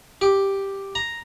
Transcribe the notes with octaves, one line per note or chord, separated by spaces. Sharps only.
G4
A#5